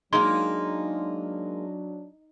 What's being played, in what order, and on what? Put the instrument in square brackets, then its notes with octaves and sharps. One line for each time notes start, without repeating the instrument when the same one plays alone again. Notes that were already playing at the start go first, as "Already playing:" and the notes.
[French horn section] F#3 D4 [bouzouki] G#3 A#3 [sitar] D#4 [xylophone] C6